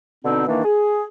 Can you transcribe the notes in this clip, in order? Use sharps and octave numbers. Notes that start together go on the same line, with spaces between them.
B2 D3 C4 D#4
D#3 E3 A#3 D4
G#4